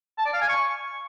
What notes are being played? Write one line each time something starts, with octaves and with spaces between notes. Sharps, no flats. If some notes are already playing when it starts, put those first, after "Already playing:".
A5
D5
F5
G#5
C#6